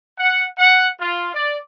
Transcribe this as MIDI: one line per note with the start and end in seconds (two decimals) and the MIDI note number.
0.18 0.42 78
0.58 0.86 78
0.99 1.28 65
1.33 1.55 74